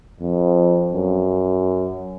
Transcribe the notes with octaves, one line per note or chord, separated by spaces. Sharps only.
F2
F#2